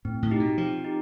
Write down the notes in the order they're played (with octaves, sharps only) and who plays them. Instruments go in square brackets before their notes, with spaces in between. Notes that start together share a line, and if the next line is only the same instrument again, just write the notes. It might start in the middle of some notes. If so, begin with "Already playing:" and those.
[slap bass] A2 [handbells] C4
[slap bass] A2
[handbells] D#4 G4
[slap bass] B2
[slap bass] F3 [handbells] C4
[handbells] D#4 G4